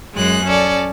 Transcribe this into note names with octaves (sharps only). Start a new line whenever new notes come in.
F#2 G#3 G#4 F#6
C#4 A4 D5